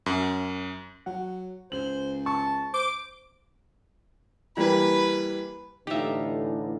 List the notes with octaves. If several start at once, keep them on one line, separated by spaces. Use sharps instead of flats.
F#2
F#3 F#5
C#2 C5 F#7
A5 C#6
C5 D6
E3 G3 A#3 B4
A2 D3 E3 D#4 F4 G4 E5